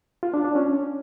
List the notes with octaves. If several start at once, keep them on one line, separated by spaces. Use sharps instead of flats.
F4
D4
D4
C#4